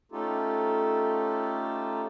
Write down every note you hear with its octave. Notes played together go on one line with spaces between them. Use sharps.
A3 C#4 D#4 F4 G4 A4